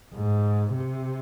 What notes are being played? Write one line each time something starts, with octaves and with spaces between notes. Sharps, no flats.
G#2
C3